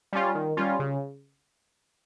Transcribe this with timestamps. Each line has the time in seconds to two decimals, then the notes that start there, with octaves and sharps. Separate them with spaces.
0.12 G3 C#4 F4
0.35 D#3
0.57 G3 C#4 F4
0.79 C#3